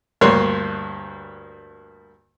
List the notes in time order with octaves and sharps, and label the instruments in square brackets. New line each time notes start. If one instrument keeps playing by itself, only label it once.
[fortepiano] D2 G2 A#3 C#5 C6 F#6